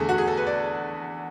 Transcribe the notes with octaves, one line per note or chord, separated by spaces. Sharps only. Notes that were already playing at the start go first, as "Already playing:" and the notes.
Already playing: E2 D3 A3 G#4
F#4
G#4
A4
B4
D5